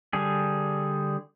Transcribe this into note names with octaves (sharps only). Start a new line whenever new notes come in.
D3 G3 G#4